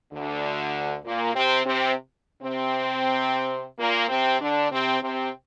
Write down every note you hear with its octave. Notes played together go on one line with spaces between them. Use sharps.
D2 D3
A#2 A#3
C3 C4
C3 C4
C3 C4
A#2 A#3
C3 C4
D3 D4
C3 C4
C3 C4